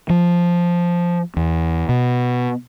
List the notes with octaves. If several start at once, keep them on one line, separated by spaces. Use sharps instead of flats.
F3
E2
B2